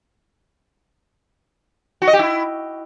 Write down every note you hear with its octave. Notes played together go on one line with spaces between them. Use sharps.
F#4
D#5
G4
E4